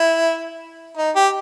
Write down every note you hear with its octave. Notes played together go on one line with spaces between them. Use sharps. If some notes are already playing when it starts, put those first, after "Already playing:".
Already playing: E4
D#4
G4